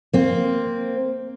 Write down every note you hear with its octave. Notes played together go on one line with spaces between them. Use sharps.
A#3 C4